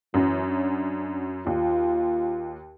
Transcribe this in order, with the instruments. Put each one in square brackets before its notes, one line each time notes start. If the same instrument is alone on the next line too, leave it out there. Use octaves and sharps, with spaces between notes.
[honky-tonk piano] F#2 F#3 C#4 [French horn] E3
[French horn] D4
[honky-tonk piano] D#2 [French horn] F4